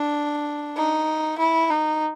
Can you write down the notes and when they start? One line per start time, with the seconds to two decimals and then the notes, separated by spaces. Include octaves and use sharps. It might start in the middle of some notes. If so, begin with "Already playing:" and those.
Already playing: D4
0.77 D#4
1.39 E4
1.70 D#4